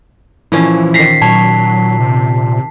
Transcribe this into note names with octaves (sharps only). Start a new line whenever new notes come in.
A#2 E3 F3 C#4 E4
D#3 A#5 B6 C7
A#2 F#3 C#5 A5
C3